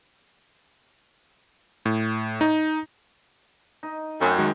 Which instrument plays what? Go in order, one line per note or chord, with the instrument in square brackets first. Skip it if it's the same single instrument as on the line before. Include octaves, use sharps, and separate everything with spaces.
[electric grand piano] A2
D#4
[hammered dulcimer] D#4
[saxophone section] F#2 [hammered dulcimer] A3 C4
[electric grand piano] D#3 G#3 F#4